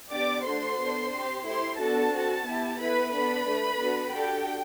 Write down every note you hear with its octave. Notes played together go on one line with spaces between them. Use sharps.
B3 D4 G4 D5 D6
A3 D4 F#4 A4 C5 C6
B3 D4 A4
C4 G4
A3 E4 G4 C5 C6
B3 D4 F#4 A4 A5
C4 F#4 A4
B3 E4 G4
B3 E4 A4 B4 B5
B3 D4 A4 B4 B5
A3 D4 A4
B3 D4 F#4 A4
D4 F#4 G4 A4 G5